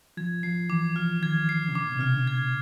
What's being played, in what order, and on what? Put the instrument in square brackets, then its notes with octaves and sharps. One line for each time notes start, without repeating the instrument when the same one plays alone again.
[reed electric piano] F3 [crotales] G#6
[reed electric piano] F3 [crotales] C7
[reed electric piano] E3 [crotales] D6
[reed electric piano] F3 [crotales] F6
[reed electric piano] D#3 [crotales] G#6
[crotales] C7
[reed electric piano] C#3
[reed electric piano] D3 [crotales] D6
[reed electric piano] A#2
B2
[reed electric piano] C3 [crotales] F6
[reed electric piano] C#3
D3
[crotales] G#6